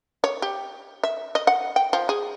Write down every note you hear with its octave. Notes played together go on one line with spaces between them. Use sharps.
C#5
G4
E5
D#5
F#5
G5
F3
G#4